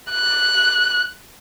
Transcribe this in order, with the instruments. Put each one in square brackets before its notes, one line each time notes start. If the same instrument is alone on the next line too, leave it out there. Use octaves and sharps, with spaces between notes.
[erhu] F#6